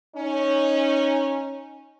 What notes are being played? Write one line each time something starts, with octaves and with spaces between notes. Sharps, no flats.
C#4 D#4